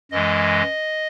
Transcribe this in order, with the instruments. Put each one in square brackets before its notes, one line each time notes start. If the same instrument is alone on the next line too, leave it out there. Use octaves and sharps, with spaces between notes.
[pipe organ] F#2 E3 G#3 D#5